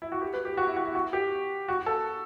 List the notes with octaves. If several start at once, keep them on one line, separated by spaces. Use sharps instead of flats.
E4
F#4
G4
B4
G4
F#4
E4
F#4
E4
F#4
G4
F#4
A4